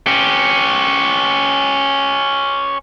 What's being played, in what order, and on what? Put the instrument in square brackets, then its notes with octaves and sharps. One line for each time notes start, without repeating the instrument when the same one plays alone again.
[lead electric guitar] C#4 G4